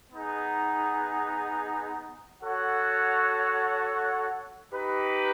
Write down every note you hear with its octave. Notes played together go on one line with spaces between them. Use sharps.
B3 D#4 G#4
F#4 A4 C#5 F#5
D#4 G4 B4